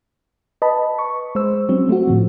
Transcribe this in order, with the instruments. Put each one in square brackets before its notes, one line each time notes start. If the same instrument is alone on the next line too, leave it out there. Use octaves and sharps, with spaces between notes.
[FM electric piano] B4 D#5 A5 B5
C#6
G#3 C5 E6
F#3 C4 C#4
A3 C4 F#4
A2 D3 F3